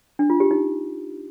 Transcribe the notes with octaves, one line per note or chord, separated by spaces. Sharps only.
D4
F4
G4
D#4